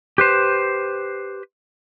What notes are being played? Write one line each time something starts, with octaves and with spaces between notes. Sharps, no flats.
G4 B4 C5